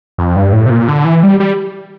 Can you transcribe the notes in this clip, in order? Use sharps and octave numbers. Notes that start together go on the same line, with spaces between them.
F2
G2
A2
C3
A#2
D3
E3
G3
G3